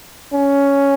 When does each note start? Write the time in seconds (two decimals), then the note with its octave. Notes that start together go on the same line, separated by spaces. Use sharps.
0.34 C#4